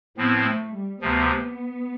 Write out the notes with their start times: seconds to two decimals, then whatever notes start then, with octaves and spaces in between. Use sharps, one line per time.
0.17 A2 F3 B3 C4 E4
0.46 A3
0.73 G3
1.01 D2 C3 F3 B3